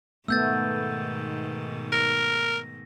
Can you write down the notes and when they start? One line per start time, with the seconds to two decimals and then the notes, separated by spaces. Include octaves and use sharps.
0.28 G#2 B2 D#3 A3 B3 E6 G6 A6
1.92 A#4 A#6